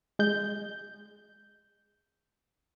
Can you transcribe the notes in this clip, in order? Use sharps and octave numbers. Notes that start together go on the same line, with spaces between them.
G#3 G6